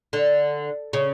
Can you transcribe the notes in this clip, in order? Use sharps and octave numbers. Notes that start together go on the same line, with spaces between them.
D3
C#3